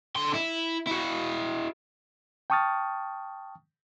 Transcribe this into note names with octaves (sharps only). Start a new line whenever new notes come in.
D3 C6
E4
E4 F#4
G5 A5 C#6 D#6 F6 A6